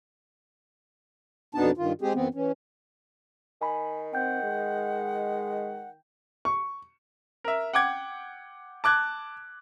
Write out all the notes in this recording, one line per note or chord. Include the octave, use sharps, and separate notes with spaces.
F2 B2 B3 D4 D#4 A5
G2 D#3 F4
G#3 C4 G4 G#4
F#2 E3 B3 C4
E3 C#4
D#3 G#5 B5
C4 F#5 G5 G6
G#3
C#6
A#4 E5
F#5 G5 D6 G#6
A5 D6 F#6 G#6